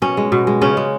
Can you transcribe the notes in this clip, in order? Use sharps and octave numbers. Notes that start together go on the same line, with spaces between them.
B2 C#4
G#3
B2
G#3
C#3 C#4
G#3